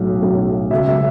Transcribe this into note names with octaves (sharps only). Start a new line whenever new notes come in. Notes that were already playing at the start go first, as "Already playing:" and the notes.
Already playing: B1 A2 F#3
B1 A2 F#3
C#2 C#3 F#3 E5
E5